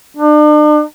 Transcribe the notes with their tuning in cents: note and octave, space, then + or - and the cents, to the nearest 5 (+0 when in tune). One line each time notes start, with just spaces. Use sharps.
D4 +40